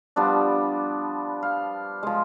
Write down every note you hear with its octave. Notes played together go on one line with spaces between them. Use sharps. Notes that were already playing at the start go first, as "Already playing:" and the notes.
F3 G3 B3 D4
F5
F3 G#3